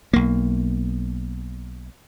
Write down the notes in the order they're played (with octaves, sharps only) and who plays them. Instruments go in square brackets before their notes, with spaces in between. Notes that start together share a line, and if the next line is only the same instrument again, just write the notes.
[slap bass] B1 A#3